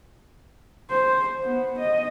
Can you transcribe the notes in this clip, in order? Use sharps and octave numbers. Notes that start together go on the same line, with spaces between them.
C5
B3
D#5